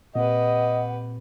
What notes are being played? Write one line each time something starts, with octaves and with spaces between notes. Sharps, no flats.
A#2 C4 G4 B4 D#5 F#5